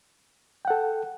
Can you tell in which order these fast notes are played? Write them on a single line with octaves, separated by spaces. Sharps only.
G5 F#5 A4